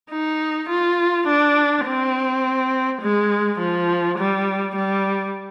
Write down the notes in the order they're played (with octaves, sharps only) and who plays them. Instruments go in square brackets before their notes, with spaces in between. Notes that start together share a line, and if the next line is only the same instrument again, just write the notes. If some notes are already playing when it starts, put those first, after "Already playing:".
[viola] D#4
F4
D4
C4
G#3
F3
G3
G3